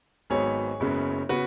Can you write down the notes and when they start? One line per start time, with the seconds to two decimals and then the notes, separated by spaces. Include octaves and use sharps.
0.30 G#1 G#2 F#3 B3 G#4 C#5
0.80 F#1 F#2 C#3 G#3 B3
1.29 C#3 B3 F#4 B4